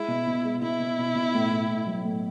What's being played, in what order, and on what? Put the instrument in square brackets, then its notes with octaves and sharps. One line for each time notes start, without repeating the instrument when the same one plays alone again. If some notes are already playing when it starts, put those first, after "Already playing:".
Already playing: [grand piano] G#3 [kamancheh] E4
[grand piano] B2
B2
G#3
[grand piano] B2 [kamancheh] E4
[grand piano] B2
B2
B2
A2
A2
A2
F#3
A2